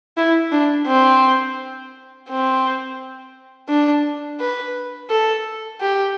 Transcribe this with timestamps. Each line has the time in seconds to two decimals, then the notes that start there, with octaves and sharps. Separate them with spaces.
0.18 E4
0.52 D4
0.87 C4
2.29 C4
3.69 D4
4.40 B4
5.10 A4
5.81 G4